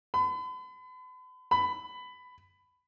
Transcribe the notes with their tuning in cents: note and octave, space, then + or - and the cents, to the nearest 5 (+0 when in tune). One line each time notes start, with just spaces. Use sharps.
B5 +40
B5 +15